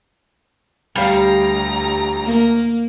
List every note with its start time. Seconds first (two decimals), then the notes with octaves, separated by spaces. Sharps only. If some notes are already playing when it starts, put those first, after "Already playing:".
0.96 D2 G3 F5 A#5
2.25 A#3